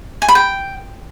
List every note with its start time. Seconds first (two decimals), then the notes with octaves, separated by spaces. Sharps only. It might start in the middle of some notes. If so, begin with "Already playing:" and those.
0.22 G#5
0.28 B5
0.35 G5